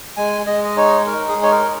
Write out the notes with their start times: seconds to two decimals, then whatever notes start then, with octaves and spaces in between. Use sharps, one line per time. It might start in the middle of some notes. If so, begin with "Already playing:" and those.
0.17 G#3 G#5
0.46 G#3 D#5
0.65 D#5
0.77 D#4 C#5
1.06 D#4 A#4
1.28 G#4
1.36 G#3
1.43 C#5
1.51 A#4